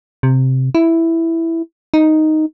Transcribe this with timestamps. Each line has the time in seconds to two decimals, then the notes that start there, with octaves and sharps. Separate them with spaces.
0.23 C3
0.75 E4
1.94 D#4